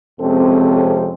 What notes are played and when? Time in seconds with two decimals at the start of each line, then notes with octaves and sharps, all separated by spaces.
0.20 F2 C3 G#3 C4 C#4 A4